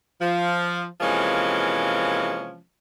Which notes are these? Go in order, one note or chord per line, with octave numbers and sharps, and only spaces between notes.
F3
C3 E3 F3 G#3 A#3 C#4